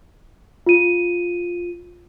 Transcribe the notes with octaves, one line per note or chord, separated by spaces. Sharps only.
F4 D#7